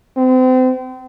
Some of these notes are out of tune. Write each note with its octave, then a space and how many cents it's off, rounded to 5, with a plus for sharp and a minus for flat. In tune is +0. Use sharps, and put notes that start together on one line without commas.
C4 -35